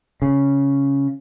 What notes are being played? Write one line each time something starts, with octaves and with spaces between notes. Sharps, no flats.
C#3